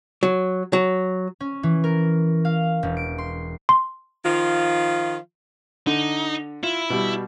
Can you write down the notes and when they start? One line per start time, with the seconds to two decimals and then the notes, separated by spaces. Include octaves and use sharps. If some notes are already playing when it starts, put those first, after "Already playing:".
0.23 F#3
0.73 F#3
1.40 C#4
1.63 E3
1.84 A#4
2.45 F5
2.83 E1
2.97 D7
3.18 C6
3.69 C6
4.25 D#3 F3 F4
5.87 D3 D#4
6.63 E4 F4
6.90 B2 G3